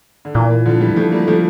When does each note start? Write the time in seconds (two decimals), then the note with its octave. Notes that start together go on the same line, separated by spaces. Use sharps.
0.25 D3
0.34 A#2 E3
0.50 E3
0.66 D3 F3
0.81 E3 G3
0.96 F3 A3
1.12 G3 A#3
1.27 F3 A3